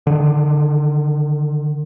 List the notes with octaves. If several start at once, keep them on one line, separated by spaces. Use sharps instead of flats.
D3 D#3